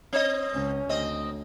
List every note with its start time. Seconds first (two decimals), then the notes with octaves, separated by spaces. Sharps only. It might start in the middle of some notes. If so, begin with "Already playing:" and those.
0.13 C4 D#5
0.52 C#2 C#4
0.89 D2 C4 D#5